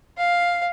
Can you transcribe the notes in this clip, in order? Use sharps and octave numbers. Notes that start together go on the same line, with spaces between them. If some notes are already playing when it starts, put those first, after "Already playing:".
F5